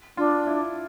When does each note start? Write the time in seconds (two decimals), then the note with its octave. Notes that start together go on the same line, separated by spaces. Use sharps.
0.17 D4 F4
0.47 E4